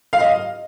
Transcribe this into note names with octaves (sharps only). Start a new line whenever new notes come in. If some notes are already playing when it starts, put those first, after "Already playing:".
F5
D#5